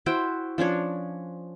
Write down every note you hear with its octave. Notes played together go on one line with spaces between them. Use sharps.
E4 F#4 C5 G5
F3 C#4 D4 C#5